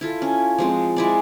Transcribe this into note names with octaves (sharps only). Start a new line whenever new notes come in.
E4 F4 A4
C#4
F3 G#3 C4
G#3 E4 D5